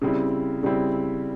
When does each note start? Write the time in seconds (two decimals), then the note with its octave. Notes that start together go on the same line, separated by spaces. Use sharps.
0.02 C#3 G3 C4 E4
0.63 C#3 G3 C4 E4